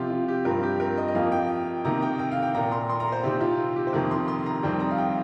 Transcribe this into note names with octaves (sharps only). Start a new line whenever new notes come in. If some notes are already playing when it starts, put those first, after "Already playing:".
Already playing: C3 F3 C4 F4 G4
F4
G4
G2 F3 C4 A#4
G4
A#4
D#5
D#5
F2 F3 A#3 F5
G5
C3 D#3 A#3 A#5
G5
G5
F5
G5
A#2 A#3 A#5
C6
C6
A#5
C5
C3 D#3 C4 G4
F4
G4
C5
F2 C3 D#3 A#3 A#4
C6
C6
A#5
F2 D#3 G3 C4 G5
A#5
F5
G5